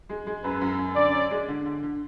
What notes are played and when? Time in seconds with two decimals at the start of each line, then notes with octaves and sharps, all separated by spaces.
0.09 G#3
0.27 G#3
0.43 F#2 B4
0.61 F#2
0.79 F#2
0.96 D3 D5
1.14 C#4
1.31 G#3
1.48 D3
1.65 D3
1.83 D3